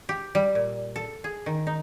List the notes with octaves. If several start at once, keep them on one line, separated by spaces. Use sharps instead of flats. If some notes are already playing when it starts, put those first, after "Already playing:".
G4
G3
A#2
A4
G#4
D#3
D#4